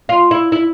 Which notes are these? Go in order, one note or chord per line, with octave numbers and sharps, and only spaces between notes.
F4
E4
E4